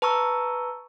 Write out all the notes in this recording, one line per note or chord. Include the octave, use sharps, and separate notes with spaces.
B4 A5 A#5 C#6 E6